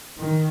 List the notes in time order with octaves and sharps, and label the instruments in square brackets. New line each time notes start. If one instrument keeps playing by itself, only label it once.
[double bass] D#3